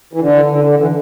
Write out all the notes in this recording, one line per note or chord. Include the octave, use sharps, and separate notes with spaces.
E3
D3
D3
D3
E3